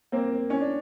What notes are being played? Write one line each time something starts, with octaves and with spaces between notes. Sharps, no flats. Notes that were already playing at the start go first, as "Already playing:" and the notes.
A#3 C4
C#4
D4